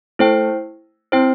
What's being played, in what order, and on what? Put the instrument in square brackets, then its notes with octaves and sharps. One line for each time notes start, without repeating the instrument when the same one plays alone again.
[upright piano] A3 [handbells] E4 C5 G5
[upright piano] C4 [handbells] E4 C5 G5